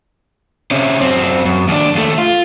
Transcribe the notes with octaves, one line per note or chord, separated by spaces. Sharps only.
C3 C#4
F#2 C4
F#2
D#2 D4
D#2 A3
F4